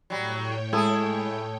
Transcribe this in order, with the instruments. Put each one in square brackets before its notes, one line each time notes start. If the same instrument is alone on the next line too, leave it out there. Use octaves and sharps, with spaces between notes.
[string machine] A2 C#5 G5 [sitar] F#3 G3
[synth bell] G#3 [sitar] E4 G#4 [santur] A4 D#6